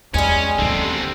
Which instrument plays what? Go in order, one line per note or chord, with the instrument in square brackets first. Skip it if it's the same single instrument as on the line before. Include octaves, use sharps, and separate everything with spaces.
[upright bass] E2 [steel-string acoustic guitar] G3 G#5 [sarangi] G#3 [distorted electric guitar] C#4
[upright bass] D#2 C#4 [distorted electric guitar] D3 C4 [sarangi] A4